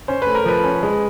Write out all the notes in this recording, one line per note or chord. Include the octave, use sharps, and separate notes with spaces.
C#4 C5
A3 B4
A#4
F3 B4
C#4
G#3